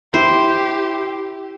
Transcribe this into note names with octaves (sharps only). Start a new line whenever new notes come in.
E4 G4 C5